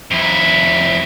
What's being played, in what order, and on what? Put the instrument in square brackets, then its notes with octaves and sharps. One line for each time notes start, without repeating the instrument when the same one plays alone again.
[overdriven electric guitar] F2 E4